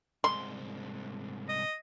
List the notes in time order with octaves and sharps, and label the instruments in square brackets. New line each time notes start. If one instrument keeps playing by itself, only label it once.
[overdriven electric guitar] C2 G#2 [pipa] C6
[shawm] D#5